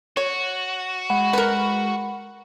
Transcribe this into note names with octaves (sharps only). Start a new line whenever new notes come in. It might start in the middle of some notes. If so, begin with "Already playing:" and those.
F#4 C#5
G#3 F#5 B5
A#4 B4